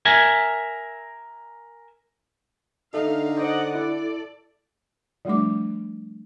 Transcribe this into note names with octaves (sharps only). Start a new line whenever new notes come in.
A#4 E5 G#5
D3 D4 D#4 A4 E5 F5
C5 D5 D#5 F#5
E4 A4 D5
F3 G3 A3 D4 D6